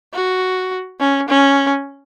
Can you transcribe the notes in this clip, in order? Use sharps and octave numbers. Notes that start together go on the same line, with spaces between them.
F#4
C#4
C#4